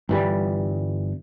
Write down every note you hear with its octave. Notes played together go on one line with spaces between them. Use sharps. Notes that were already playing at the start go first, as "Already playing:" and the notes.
G1 E3 G3